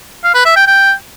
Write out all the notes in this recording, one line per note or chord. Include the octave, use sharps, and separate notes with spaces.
F5
B4
E5
G5
G5